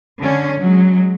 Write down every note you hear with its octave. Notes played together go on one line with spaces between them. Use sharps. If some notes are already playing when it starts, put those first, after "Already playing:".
D3 C#4
F#3 G#3